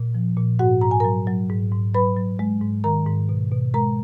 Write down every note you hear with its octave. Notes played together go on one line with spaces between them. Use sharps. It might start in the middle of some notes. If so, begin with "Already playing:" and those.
Already playing: A#2
F3
A#2
G#2 F#4 F#5
G#2 A#5
G#5
F#3 A#4 A#5
F#3
G#2
G#2
F#3 B4 B5
F#3
G#3
G#2
D#3 A#4 A#5
G#2
B2
B2
G#3 A#4 A#5